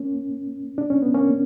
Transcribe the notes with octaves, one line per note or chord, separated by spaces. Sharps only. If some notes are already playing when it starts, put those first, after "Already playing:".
Already playing: A#3 C#4
D4
C#4
B3
A#3 C#4